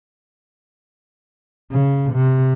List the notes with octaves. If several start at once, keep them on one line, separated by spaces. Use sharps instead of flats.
C#3
C3